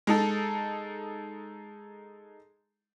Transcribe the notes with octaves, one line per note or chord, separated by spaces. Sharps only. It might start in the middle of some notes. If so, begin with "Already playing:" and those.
G#3 D#4 A4